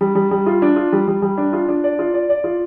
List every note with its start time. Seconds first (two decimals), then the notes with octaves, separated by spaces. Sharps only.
0.01 G3
0.15 G3
0.31 G3
0.46 F4
0.62 D4
0.76 F4
0.93 G3
1.08 G3
1.22 G3
1.38 D4
1.53 F4
1.69 D4
1.84 D5
1.99 F4
2.14 D5
2.29 D5
2.44 F4